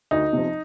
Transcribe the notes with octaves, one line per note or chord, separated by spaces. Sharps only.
D2 D#4
C3 F3